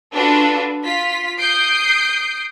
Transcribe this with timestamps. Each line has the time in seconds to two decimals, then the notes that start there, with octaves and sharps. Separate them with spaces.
0.13 D4 F4 F#4 A4 B4
0.85 F4 B6
1.39 D#6 G6 C7 D7